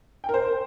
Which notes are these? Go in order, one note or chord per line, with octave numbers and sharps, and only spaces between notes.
G5
A#4
C5